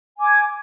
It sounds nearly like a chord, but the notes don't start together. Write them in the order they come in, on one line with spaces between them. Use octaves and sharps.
G#5 D6 G#6